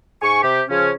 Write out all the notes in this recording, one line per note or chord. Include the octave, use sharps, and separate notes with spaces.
G#2 G#5 C#6
C3 G4
C#3 F3 C#4